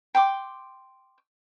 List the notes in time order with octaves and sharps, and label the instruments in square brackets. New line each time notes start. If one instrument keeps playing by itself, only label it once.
[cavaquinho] G5 C6 D6